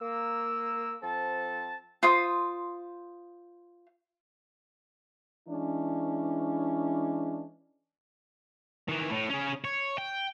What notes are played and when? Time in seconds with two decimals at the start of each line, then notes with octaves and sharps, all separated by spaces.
0.01 A#3 E6
1.03 F3 C4 A4 A5
2.03 F4 C5 D#6
5.49 E3 G#3 C#4 D4
8.88 D#3 E3
9.11 A2
9.29 C#4 G#4
9.64 C#5
9.98 G5